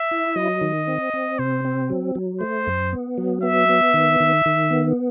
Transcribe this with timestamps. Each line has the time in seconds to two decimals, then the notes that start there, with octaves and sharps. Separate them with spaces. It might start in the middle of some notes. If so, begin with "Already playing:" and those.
Already playing: E5
0.11 E4
0.36 F#3 D#5
0.61 D#3
0.88 C4
1.14 C4
1.39 C3 C5
1.65 C4
1.90 F#3
2.15 F#3
2.41 A3 C5
2.67 F#2
2.93 B3
3.18 F#3
3.43 B3 E5
3.69 B3
3.94 D#3
4.20 D#3
4.46 D#3
4.70 B3